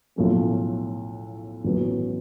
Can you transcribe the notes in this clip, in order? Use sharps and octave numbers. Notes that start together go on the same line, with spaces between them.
B1 A2 F3 A3 C#4
A1 A2 F#3 B3